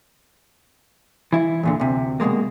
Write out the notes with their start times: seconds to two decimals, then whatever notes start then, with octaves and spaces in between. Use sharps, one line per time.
1.33 E3 E4
1.63 E2 A#2 D3
1.80 D2 C3
2.20 C2 B2 D#3 G#3 A#3